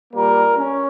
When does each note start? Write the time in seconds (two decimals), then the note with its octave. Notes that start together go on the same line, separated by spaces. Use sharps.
0.13 A#2 G3 A#3 A#4
0.57 C#4